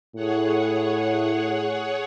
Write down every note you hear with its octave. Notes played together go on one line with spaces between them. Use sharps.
A2 G#4 C#5 F#5